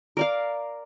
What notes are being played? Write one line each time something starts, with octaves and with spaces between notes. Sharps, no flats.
A#4 D5 F5